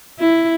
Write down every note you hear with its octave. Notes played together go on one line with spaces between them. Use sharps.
E4